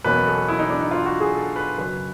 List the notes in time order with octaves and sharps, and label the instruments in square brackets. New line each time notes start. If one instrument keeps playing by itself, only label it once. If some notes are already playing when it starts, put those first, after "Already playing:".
[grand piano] E2 B2 F#3 A#3 C#4 B4
A4
E4
D#4
D4
D#4
F4
F#4
G#4
A4
B4
F#2 C#3 F#3 B4